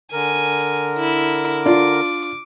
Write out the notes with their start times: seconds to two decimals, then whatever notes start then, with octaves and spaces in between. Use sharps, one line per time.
0.12 D3 A#4 G#5
0.98 E4
1.66 D4 F4 D6